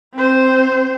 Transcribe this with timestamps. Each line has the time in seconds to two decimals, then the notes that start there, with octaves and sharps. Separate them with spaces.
0.14 C4 C5